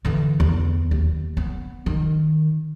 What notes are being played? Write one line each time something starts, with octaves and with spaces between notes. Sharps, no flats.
D3 E3
E2
D#2
B3
D#3